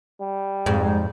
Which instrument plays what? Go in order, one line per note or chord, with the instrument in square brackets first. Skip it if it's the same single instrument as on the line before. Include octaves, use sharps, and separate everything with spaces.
[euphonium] G3
[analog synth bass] F2 [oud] G#2